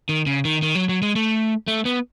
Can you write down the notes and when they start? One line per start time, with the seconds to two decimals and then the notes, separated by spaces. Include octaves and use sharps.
0.09 D#3
0.26 C#3
0.45 D#3
0.62 D#3
0.75 F#3
0.89 F#3
1.02 G#3
1.16 A3
1.68 A3
1.85 B3